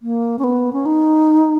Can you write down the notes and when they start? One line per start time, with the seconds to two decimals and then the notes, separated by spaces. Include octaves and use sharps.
0.02 A#3
0.39 C#4
0.44 B3
0.73 C#4
0.86 D#4